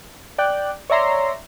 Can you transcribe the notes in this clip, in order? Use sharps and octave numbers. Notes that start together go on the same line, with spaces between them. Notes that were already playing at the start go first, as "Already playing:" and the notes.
D5 G5 F#6
C#5 D5 E5 A#5 C6